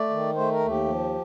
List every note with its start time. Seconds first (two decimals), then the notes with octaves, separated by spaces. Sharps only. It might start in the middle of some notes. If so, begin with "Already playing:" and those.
Already playing: A3 D5
0.10 D#3
0.34 A3 C5
0.51 A#4
0.60 D#2
0.68 G4
0.85 F3